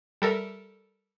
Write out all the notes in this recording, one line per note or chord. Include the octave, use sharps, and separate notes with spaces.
G3 A4 A#4 E5